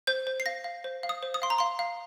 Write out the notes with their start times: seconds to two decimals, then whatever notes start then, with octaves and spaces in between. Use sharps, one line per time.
0.07 C5 G6
0.27 C5
0.40 C7
0.46 F5 A#6
0.64 F5
0.84 C5
1.03 F5
1.09 D#6
1.23 C5
1.34 D#6
1.42 F5 C6
1.50 A#5
1.58 F5 C6
1.79 F5